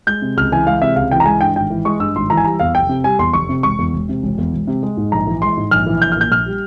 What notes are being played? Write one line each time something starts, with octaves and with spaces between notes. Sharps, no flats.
G#3 G6
C3
C#2 F6
E3 G#5
G#3 F5
C3 E5
C#2 F5
E3 G5
A#5
G#3 G#5
G2 G5
G#1 G5
E3
G#3 C#6
G2 E6
G#1 C6
E3 A#5
G#5
G3 A#5
E2 F5
F1 G5
C3
G3 G#5
E2 C6
F1 C#6
C3
E1 C#6
E2
E1
C3
E1
E2
E1
C3
G#3
G#2
A#1 A#5
E3
G#3 C6
G#2
A#1 F6
E3
A#1 G6
F6
A#2 G6
A#1 F6
G3